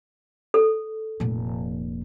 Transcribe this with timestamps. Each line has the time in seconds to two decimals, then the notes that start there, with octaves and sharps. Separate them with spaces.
0.54 A4
1.20 F1 A#2